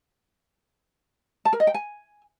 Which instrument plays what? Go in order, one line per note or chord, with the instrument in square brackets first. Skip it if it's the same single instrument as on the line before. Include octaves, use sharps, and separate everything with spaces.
[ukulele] A5
A#4
D#5
G5
G#5